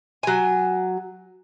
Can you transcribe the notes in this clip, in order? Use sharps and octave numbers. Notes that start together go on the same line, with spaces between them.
F#3 G#5